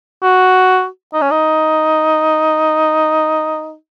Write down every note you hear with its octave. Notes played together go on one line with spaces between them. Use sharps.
F#4
D#4
C#4
D#4